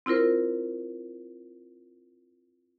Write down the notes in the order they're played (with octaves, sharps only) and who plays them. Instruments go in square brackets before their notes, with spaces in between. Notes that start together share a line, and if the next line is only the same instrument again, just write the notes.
[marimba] C4 E4 F4 A#4 C5